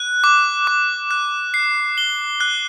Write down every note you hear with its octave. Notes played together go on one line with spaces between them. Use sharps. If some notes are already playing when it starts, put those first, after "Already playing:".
Already playing: F#6
D6
D6
F#6
C7
G7
F#6